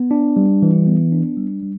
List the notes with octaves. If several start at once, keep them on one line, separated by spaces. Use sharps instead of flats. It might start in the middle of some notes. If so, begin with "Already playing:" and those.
Already playing: B3
D4
G3
E3
B3
D4
G3
G3